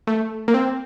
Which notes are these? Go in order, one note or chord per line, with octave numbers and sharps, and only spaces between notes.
A3
A#3
C4